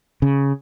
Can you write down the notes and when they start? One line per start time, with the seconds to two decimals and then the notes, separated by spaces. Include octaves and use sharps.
0.22 C#3